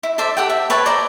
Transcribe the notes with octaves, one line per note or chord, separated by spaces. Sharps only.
E4
A4 C5 D5 E5
G4 A4 F#5 G5
E5
B4 C#5 A5
C5 D5 A5 A#5